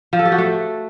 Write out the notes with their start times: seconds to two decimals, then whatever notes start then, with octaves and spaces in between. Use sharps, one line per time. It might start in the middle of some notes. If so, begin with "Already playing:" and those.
0.13 F3
0.19 A4
0.25 G4
0.32 F#4
0.38 A3